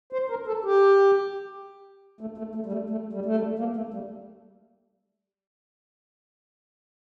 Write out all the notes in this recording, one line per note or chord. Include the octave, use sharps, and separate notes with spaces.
C5
A#4
A4
G4
A3
A3
A3
G3
A3
A3
G3
A3
G3
A#3
A3
G3